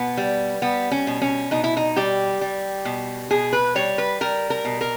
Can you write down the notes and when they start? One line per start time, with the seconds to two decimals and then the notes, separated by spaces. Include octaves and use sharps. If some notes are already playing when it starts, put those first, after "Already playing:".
Already playing: B2 B3
0.17 G3
0.62 G3 B3
0.91 C#4
1.07 B2
1.22 C#4
1.51 B2 D#4
1.64 E4
1.77 D#4
1.96 G3 G4
2.41 G3
2.85 B2
3.31 B2 G#4
3.53 B4
3.75 G3 C#5
3.98 B4
4.21 G3 A#4
4.50 A#4
4.65 B2
4.81 A#4